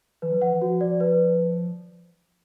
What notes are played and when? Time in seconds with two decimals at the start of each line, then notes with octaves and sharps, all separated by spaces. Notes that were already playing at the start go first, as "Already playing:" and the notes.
0.22 E3 B4
0.32 F#3
0.42 F3 F#5
0.51 E3
0.62 F3 F#4
0.81 D5
1.00 B4